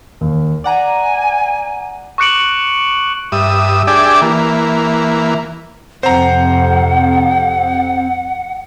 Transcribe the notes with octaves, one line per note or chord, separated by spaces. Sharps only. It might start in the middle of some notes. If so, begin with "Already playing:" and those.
D#2
D5 F#5 G#5 A#5
C#6 D6 F#6 C#7 D7 F#7
G2 E5 D#6
D4 G4 G#4 D5 E5
E3 A#3
F2 C3 F3 C4 C5 F#5 A#5